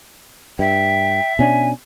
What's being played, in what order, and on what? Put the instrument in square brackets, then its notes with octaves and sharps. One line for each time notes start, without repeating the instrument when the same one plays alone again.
[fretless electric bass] G2 [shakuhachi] E5 [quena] G5
[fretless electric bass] B2 C#4 D4 [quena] G#5